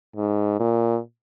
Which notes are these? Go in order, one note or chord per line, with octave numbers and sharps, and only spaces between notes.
G#2
A#2